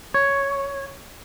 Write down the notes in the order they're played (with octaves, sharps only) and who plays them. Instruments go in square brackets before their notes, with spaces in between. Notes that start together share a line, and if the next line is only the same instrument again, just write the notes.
[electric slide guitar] C#5